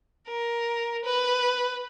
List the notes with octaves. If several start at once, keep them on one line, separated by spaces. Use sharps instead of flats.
A#4
B4